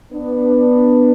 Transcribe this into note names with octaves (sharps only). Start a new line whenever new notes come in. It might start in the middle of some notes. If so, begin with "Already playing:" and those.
B3 D4